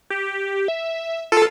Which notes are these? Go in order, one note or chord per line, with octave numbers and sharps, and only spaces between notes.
G4
E5
F4 A4